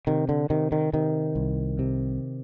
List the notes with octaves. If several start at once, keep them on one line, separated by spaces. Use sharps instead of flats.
C3 D#3
D3
C3 D#3
D#3
C3 D#3
C2
C3